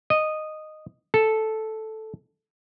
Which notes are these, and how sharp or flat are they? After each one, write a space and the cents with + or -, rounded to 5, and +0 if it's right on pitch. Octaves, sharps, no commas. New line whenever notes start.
D#5 -10
A4 -5